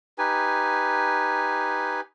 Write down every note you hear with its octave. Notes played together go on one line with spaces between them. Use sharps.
D#4 G4 B4 G#5